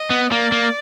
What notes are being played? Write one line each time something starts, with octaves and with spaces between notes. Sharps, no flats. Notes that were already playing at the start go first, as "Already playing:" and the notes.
Already playing: D#5
B3
A#3 D5
A#3